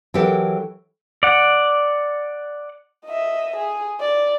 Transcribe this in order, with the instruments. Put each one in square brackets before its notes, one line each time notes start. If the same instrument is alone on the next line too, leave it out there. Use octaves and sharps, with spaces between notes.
[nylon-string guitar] E3 F#3 G4 A4 A#4
[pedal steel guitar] D5 F#5
[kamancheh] D#5 E5
G#4
D5